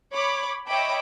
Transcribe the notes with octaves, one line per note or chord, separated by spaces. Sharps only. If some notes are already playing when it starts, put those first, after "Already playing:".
C#5 B5 D6
C#5 D#5 E5 G5 B5 D6